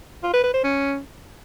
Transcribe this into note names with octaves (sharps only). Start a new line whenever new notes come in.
F4
B4
B4
C5
C#4